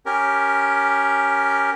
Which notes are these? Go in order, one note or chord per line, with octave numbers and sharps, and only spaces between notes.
C#4 G4 A#4